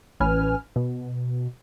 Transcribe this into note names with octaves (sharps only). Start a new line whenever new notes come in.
A1 C#4 B4 G#5 F6
B2